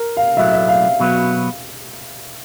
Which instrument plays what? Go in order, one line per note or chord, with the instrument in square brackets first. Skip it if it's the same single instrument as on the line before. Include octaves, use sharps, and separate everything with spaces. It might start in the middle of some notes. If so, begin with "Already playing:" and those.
Already playing: [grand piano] A#4
F5
[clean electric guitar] B1 A2 F#3 A3 [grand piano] E5
[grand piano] E5
F5
[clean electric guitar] B2 F#3 B3